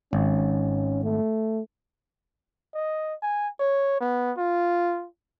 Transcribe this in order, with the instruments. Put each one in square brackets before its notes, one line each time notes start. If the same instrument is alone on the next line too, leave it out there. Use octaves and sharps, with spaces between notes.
[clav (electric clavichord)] G#1 [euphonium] C#4
[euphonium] A3
[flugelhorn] D#5
G#5
C#5
B3
F4